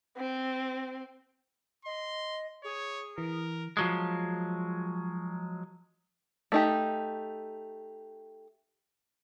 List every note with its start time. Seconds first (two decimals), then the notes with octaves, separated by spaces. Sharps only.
0.17 C4
1.85 D#5 C6
2.64 G#4 C#5
3.18 E3 A#4
3.77 F3 F#3 G#3
6.52 A3 D#4 G4